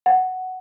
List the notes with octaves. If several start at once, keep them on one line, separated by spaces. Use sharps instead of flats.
F#5